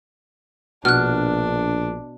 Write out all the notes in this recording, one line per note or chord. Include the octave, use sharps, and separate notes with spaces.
A#1 B2 D4 F6 F#6